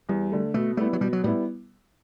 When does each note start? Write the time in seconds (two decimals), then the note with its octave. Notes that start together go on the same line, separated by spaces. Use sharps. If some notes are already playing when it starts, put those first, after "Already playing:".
0.09 E2 G3
0.32 D3 A3
0.54 B2 A3
0.77 G3 A3 B3 E4
0.93 F#3
1.01 B2 G3
1.13 F#3
1.24 A2 G3 B3 E4